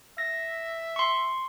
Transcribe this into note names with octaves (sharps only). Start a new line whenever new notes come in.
E5 A#6
C6 C#6